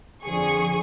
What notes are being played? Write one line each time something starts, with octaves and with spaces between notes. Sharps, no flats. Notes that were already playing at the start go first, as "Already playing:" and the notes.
F2 D3 F3 G#4 C#6